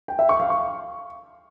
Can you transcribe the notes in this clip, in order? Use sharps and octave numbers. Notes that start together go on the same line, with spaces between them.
G5
E5
C#6
F5
C#6